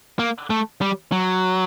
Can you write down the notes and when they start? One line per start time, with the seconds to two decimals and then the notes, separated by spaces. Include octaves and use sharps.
0.19 A#3
0.50 A3
0.81 G3
1.12 F#3